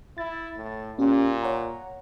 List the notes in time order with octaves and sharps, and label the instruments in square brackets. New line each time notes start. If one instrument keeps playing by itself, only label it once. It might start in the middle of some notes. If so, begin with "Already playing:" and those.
[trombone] E4 [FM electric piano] A6
[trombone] A2
[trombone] A#2 [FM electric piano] C#4 G4
[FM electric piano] C#5 F#5 A#5